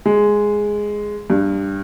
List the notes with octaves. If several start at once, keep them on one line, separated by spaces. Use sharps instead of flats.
G#3
G2